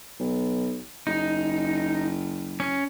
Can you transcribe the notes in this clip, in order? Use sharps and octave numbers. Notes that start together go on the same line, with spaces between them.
B1
F#1 D#4
C#4